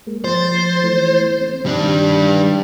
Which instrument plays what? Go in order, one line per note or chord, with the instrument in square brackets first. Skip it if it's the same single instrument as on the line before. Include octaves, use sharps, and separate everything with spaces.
[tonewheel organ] G#3 A#3
[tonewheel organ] F3 A6 [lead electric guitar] C5
[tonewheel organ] E3 A3
C4
[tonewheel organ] D#3 G4 [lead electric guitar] G3 D4